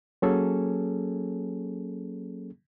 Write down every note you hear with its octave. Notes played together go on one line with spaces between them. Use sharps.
F#3 A#3 C#4 G#4 A4